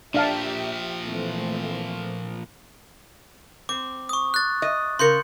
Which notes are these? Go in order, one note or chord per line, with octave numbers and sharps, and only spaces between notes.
A#2 F3 D4 G4 E5 F5 A5
E3 A3 C4
C4 D6
C#6 D#6
F#6 A6
D#5
C#3 A#4 C6 G6 C#7